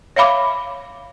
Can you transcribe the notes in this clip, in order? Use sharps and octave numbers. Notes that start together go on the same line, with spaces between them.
C#5 E5 F5 B5 D6